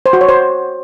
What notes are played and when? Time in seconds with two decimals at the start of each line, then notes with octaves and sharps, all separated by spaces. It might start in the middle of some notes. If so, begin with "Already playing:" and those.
0.06 C5
0.13 F#4
0.21 C#5
0.29 C5